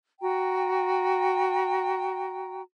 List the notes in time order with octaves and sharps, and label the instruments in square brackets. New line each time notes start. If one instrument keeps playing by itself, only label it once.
[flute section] F#4 G5 A#5